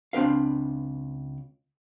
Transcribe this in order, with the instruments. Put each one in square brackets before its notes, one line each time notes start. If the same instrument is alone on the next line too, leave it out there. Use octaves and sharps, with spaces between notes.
[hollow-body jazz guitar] C#2 C4 D4 B4 F5